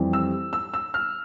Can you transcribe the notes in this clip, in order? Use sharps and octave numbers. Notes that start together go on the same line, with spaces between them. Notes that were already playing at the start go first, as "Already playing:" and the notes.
Already playing: F2 E3 G3
E6
E6
E6
F6